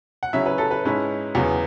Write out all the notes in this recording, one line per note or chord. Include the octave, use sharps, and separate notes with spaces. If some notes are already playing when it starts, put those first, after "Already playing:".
F#5
C#3 F#3 C#4 E4 E5
B4
A4
B4
G#2 G#3 C#4 E4
E2 C#3 F#3 B3